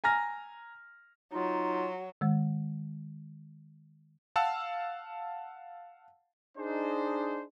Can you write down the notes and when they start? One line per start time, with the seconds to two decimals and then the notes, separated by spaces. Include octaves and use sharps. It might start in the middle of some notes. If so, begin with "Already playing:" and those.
0.04 G#5 A#5 F6 A#6
1.33 F#3 D#4 F4
2.21 D#3 G#3
4.36 F5 F#5 A5 E6
6.57 D4 D#4 G#4 C5